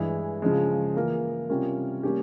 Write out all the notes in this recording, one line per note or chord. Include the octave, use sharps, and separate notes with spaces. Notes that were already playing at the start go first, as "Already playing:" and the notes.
Already playing: G2 E3 G#3 E4 G#4
C#3 F3 G#3
E3 A#3 F4 A#4
C3 G3 C#4 F4 A#4
G3 A#3 C#4 G4